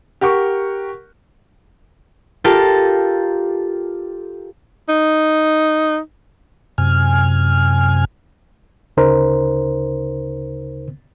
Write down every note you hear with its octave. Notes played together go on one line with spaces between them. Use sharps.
G4 A#4 F#5 C#6
F4 G4 A4 A#4
D#4
F#2 C3 G#5 F6
D2 C#3 D#4 A#4 C5